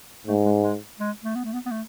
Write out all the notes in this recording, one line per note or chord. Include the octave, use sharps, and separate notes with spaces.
G#2 A3
G#3
G#3
G#3
A3
B3
A3
B3
B3
A3